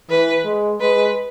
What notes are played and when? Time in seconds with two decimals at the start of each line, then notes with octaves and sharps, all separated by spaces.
0.09 E3 B4
0.45 G#3
0.80 G#3 B4